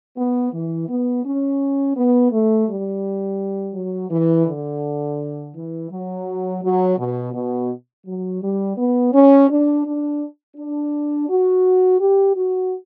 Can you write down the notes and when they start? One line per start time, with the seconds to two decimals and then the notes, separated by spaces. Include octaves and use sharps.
0.16 B3
0.52 E3
0.88 B3
1.24 C#4
1.95 B3
2.31 A3
2.67 G3
3.74 F#3
4.10 E3
4.46 D3
5.53 E3
5.90 F#3
6.62 F#3
6.97 B2
7.33 B2
8.05 F#3
8.41 G3
8.76 B3
9.12 C#4
9.49 D4
9.85 D4
10.56 D4
11.28 F#4
11.99 G4
12.35 F#4